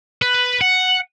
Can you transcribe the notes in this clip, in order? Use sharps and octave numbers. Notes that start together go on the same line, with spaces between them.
B4
F#5